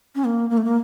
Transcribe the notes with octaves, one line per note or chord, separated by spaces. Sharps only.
C#4
A#3
A#3
A3
A#3